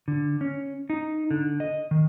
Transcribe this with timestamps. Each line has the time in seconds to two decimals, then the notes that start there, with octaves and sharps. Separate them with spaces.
0.08 D3
0.41 C#4
0.90 D#4
1.31 D3
1.60 D#5
1.91 D#3